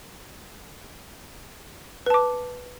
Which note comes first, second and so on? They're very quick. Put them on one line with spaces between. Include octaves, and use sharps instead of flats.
B4 A5 D6